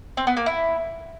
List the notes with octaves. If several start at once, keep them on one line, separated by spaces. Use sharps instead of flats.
C4
B3
A#3
E4